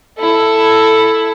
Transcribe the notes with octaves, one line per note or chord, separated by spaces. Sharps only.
E4 A4